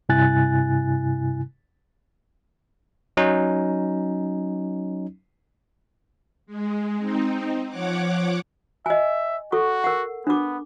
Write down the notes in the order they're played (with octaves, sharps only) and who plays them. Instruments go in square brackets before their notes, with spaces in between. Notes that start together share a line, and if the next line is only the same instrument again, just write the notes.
[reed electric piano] G2 C3 E4 G#5 F#6 A6
[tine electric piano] F#3 C#4 D#4
[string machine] G#3
C4 D#4
F3 C#5 F#5 D6
[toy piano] D#5 G#5 [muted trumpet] E5
[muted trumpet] F#4 [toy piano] A4 C#6
[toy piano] A#4 F#5
[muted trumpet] B3 [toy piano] D4 D6